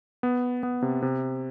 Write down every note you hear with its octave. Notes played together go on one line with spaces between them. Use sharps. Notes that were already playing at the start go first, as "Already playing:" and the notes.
B3
B3
C3
C3